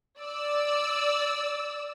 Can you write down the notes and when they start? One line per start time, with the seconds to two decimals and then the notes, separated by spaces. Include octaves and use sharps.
0.19 D5 E6